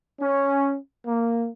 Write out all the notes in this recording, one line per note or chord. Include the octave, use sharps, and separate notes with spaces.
C#4
A#3